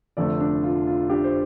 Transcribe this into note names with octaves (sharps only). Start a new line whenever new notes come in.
F1 F2 D3 A3 A4 D5
D4
F4
F4
D4 G4
C5